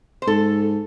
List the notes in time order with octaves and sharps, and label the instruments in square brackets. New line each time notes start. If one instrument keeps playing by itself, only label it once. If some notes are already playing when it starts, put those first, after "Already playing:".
[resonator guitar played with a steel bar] C5
[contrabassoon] G#2 [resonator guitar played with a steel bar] A4